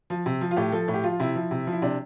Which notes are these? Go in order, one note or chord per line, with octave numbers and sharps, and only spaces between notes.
F3
C3
F3
F4
A2 G4
F3 A4
A2
G4
F3 F4
C3 E4
F3
C3
F3
E4
C3 D4